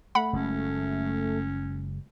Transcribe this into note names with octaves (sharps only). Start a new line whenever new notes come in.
A3 F#5 B5
F#1 G#3 C#4